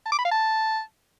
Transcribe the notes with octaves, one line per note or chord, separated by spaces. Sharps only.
A5
D6
B5
F5
A5